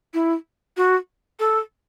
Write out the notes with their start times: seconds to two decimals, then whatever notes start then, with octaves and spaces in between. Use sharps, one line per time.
0.14 E4
0.77 F#4
1.40 A4